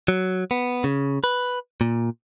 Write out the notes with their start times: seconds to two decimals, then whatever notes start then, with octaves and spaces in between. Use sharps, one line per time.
0.08 F#3
0.51 B3
0.84 C#3
1.24 B4
1.81 A#2